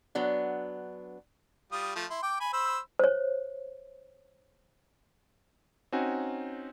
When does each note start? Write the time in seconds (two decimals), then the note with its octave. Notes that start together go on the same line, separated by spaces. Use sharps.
0.15 F#3 B3 D4
1.72 G3 F4 D#6
1.95 F3 A3
2.10 E4 C6
2.23 G5 D6
2.40 G#5 B5
2.53 C5 B5 E6
2.99 C5 C#5
5.92 C4 C#4 D#4 F#4 G#5